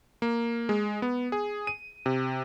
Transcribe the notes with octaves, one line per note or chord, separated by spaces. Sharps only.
A#3
G#3
B3
G#4
D#7
C3